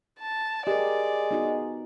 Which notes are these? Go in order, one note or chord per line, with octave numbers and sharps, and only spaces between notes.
A5
G#3 G4 A#4 D5
B3 D#4 F#4